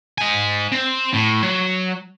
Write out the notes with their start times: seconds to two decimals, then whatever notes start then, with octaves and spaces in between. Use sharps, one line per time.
0.18 D#4 G#5
0.72 C4
1.14 A2
1.43 F#3